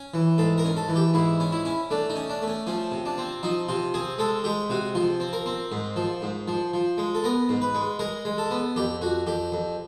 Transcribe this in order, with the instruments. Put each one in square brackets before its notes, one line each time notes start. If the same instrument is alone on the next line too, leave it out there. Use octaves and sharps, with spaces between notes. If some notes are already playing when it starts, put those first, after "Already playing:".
Already playing: [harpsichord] C#4
E3
G#2 A4
A#4
C#4
A4
E3
G4
G#2 E4
C#4
E4
C#4
A3 D4
D#4
C#4
D4
A3
C#4
F3 C#4
C3
D4
C4
F3 D#4
C3 F4
C4 G#4
G#3 A4
G#3 G4
C3 F#4
F3 F4
C4
A#4
C4
G#2
F3
G#2
F3
F3
G#3
A4
B3 A#4
G#2
B4
G#3
G#3 A#4
G#3
A4
B3
F2 G4
F2 F#4
F2 G4
F2